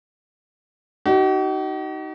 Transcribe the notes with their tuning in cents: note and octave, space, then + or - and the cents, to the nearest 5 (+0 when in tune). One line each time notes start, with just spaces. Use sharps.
D#4 +0 F#4 +45